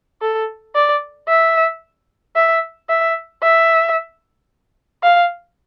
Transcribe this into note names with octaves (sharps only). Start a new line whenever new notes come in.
A4
D5
E5
E5
E5
E5
F5